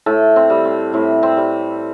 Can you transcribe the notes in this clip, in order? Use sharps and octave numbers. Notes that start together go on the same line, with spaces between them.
A2 A4
C4
G3
C4
A2 C4
C4
G3